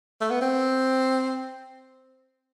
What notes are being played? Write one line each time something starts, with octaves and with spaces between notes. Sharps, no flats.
A3
B3
C4